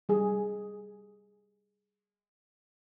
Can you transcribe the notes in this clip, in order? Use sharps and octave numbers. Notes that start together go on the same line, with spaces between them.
G3 G#4